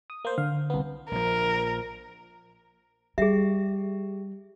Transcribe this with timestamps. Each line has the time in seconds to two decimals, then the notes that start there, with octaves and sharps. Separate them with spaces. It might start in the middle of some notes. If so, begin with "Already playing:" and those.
0.10 D#6
0.25 A#3 C5
0.38 D3 F5
0.70 C2 B3
1.11 A#1 F3 A#4
3.18 G3 G4 G#4 E5